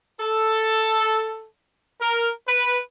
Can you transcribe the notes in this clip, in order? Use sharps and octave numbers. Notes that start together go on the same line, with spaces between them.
A4
A#4
B4